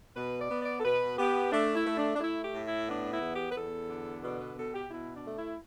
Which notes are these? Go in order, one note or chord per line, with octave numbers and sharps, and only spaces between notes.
B2 B4
D5
B3
D5
A4
B2 B4
B3 G4
A3 D4
E4
A3
D4
D4
A3 E4
G4
A2
E4
B3 D4
E4
E2
G4
B4
E2 A4
D3
B2 D5
B4
B2 A4
G4
B2 E4
D4
A3
E4